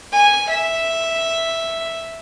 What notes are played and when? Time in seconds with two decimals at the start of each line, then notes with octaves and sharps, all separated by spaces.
0.12 G#5
0.50 E5